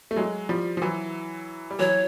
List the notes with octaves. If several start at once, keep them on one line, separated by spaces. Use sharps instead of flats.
A3
F#3 G#3
F3 G3
F3
E3 F#3
G3
E3 F#3 C#5